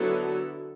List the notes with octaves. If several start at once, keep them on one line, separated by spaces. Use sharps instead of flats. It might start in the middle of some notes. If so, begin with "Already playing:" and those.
Already playing: D3 F#3 B3 E4 A4